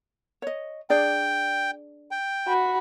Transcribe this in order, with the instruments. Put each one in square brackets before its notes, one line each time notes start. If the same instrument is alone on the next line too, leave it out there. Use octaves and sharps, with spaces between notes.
[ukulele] C#5 D#5
[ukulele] D4 G#4 D5 [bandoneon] G5
[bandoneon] G5
[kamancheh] F#4 B5